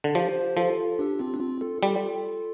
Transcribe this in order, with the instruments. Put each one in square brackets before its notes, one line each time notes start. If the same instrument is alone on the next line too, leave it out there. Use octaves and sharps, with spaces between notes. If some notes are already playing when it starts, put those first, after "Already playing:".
[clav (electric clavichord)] D3
[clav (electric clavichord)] F3 [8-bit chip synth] G4 C5
[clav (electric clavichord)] F3 [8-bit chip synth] F4 A4
[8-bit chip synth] D4 G4
C4 F4
D4
C4 F4
F4 A4
[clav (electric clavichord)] G3 [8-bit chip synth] F4 A4